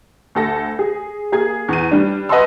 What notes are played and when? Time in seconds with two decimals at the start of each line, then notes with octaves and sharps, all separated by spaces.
0.35 D2 A4 A#6
0.79 G#4
1.32 A#3 G#4 G#6
1.69 E2 D#7
1.91 G3 D4
2.29 B4 D#5 F#5 A5 C6 E6